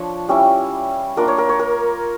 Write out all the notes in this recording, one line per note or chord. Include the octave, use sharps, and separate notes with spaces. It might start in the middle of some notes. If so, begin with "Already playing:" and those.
Already playing: F3 D4 C#5
G3 C#4 E4
A#3 D4 F4 A#4
C#5
A#4
C#5
A#4